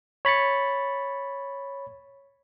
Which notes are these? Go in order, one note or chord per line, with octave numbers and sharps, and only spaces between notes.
C#5 B5 A6 C#7